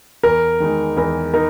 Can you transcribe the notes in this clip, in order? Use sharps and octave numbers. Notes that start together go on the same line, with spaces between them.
E2 A#4
D#3 G#3 D#4
E2 A#4
D#4 A#4